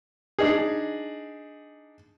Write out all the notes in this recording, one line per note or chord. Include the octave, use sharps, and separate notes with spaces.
D4 D#4 G#4